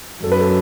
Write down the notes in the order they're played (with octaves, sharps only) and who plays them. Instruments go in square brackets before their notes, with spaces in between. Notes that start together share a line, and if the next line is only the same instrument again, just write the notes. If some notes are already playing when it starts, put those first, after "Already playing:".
[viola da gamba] F#2 [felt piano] A4
[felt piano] B4
A4